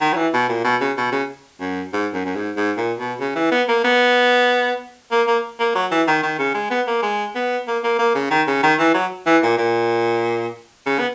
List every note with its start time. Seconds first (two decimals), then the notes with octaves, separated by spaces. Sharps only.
0.01 D#3
0.13 F#3
0.16 E3
0.33 B2
0.48 A#2
0.64 B2
0.80 C#3
0.97 B2
1.12 C#3
1.60 F#2
1.93 G#2
2.13 F#2
2.25 F#2
2.35 G#2
2.56 G#2
2.77 A#2
2.99 B2
3.20 C#3
3.35 E3
3.51 B3
3.68 A#3
3.84 B3
5.11 A#3
5.27 A#3
5.59 A#3
5.75 F#3
5.91 E3
6.07 D#3
6.22 D#3
6.38 C#3
6.54 G#3
6.70 B3
6.87 A#3
7.02 G#3
7.35 B3
7.67 A#3
7.83 A#3
7.99 A#3
8.14 C#3
8.31 D#3
8.47 C#3
8.63 D#3
8.79 E3
8.94 F#3
9.26 E3
9.43 A#2
9.57 A#2
10.86 C#3
10.99 B3